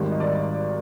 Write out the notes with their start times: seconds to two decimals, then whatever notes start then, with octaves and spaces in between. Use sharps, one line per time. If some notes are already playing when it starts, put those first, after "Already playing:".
Already playing: G#1 G#2 D#3 G3
0.12 D#5
0.20 D5